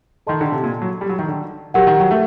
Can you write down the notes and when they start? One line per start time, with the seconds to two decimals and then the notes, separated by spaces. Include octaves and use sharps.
0.27 D#3 A4 D#5 A5 C6
0.41 D3
0.52 C3
0.63 A#2
0.82 F#3
1.01 G3
1.09 F#3
1.19 D#3
1.28 D3
1.74 F#3 G4 A#4 F#5
1.87 D#3
2.00 F#3
2.11 A3